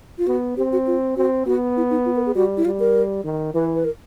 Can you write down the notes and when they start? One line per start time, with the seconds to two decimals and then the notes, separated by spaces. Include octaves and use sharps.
0.18 F4
0.27 B3 F#4
0.57 C4 G4
0.72 F#4
0.87 F4
1.17 C4 F#4
1.46 B3 F#4
1.77 E4
1.90 D#4
2.06 F4
2.16 A#4
2.26 G#4
2.35 G3 F#4
2.57 E4
2.65 G3 F4
2.80 A#4
3.24 D#3
3.54 E3 B4
3.74 B4
3.85 A#4